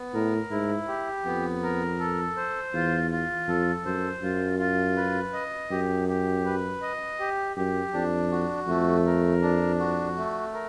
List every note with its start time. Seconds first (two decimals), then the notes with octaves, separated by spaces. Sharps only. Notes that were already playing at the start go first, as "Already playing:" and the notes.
Already playing: B3
0.14 A2 A#4
0.51 G#2 E4
0.88 G4
1.25 F2 B3
1.63 A#4
1.99 A4
2.36 C5
2.74 E2 F4
3.11 F4
3.48 F2 A4
3.85 F#2 C5
4.22 F#2 F4
4.59 F4
4.97 B4
5.34 D#5
5.71 F#2 G4
6.08 G4
6.45 B4
6.82 D#5
7.20 G4
7.57 F#2 G4
7.94 F2 D4
8.31 F#4
8.68 F2 A3
9.06 A#4
9.42 D4
9.79 F#4
10.17 A3
10.54 A#4